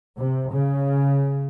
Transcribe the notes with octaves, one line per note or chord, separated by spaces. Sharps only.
C3
C#3